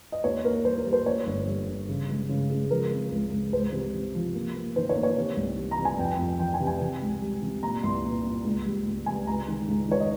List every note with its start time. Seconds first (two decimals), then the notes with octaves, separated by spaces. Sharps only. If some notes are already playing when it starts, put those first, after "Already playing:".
0.12 D#5
0.24 D#2 C#5
0.44 A#3 A#4
0.65 G3 C5
0.79 A#4
0.86 G3
0.93 C5
1.06 A#3 C#5
1.27 G1
1.47 G3
1.68 G1
1.89 C#3
2.09 G#3
2.29 C#3
2.50 G#3
2.71 F3 A#4
2.90 C4
3.11 C#2
3.32 C#2
3.52 C#2 C5
3.72 C3
3.94 C3
4.15 F3
4.35 A#3
4.55 A#3
4.76 D#3 C5
4.89 C#5
4.96 A#3
5.03 C#5
5.16 C3
5.37 C2
5.57 G3
5.71 A#5
5.78 C3
5.85 G#5
5.99 F2 G5
6.19 F2
6.40 F3 G5
6.54 G#5
6.60 C3
6.67 G#5
6.81 C3
7.01 C#2
7.22 G3
7.42 C3
7.63 A#2 A#5
7.83 C2 C6
8.04 A#2
8.24 A#2
8.44 C#2
8.66 G3
8.86 C#2
9.06 C3 G#5
9.26 C#2 A#5
9.48 D#3
9.68 C#2
9.88 D#3 C#5
10.00 D#5